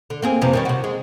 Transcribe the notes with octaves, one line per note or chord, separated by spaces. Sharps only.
D3
A#3 C4 G#4
F2 C3 E3
D#3 G3 C#4
C3 F#4
G#3